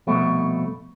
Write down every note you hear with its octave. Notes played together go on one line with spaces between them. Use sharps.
C2 F2 B2 A3